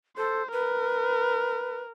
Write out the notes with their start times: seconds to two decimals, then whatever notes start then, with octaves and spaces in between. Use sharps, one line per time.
0.17 A4 C5
0.53 A#4 B4